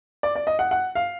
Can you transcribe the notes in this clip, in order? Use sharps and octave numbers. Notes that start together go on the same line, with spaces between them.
D5
D5
D#5
F#5
F#5
F5